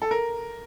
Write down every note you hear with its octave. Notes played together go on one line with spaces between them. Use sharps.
A4
A#4